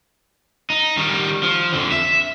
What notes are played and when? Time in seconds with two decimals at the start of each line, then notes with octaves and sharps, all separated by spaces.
0.70 D#4
0.97 D#3 G3
1.43 F3
1.74 F2 D3
1.92 E5